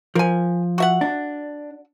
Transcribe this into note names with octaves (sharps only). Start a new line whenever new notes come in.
F3 A#4 G#5
F#4 E5 F#5
D4